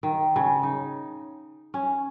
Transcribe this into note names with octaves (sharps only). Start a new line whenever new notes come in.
D#3
C#3
D#4
C#4